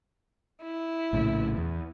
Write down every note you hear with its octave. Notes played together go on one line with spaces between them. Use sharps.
E4
A#1 A2 C#3
E2